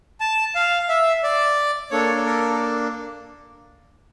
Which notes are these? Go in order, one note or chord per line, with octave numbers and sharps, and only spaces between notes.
A5
F5
E5
D5
A#3 D4 A4 C#5
A#4